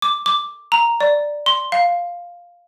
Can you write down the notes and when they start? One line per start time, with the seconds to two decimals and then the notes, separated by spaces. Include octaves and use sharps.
0.02 D6
0.26 D6
0.72 A#5
1.01 D5
1.46 C6
1.72 F5